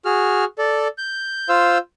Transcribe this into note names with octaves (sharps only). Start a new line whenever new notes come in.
F#4 G#4 F6
A4 D5
G6
F4 C5 F5 E6